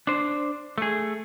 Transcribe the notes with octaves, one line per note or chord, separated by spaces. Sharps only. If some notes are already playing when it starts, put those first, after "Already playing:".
D4 C5
A3 G#4